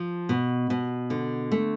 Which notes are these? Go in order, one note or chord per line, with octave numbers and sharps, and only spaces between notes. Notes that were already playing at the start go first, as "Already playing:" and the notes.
Already playing: F3
B2
B2
D3
A3